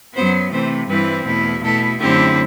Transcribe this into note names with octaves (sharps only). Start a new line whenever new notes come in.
F#2 F#3 B3 C5
C3 E3 A3 C5
G2 E3 G3 C4 E4 B4
E2 B2 A3 E4
B2 A3 E4 A4
F#2 D3 A3 C4 E4 G4